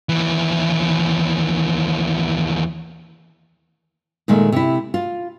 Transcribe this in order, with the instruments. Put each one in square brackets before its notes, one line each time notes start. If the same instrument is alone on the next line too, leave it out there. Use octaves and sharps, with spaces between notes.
[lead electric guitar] D#2 E3
[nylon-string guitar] A#2 D#3 G#3 A3
C3 E4
F4